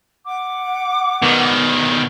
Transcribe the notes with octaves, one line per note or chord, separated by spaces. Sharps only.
F#5 D6
B2 D#3